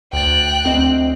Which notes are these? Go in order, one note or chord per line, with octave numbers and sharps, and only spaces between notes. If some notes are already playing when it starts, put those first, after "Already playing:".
D2 G5 F#6 A6
D2 C4 D#5